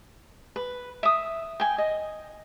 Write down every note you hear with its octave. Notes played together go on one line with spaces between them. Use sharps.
B4
E5 D#6
G5 G#5
D#5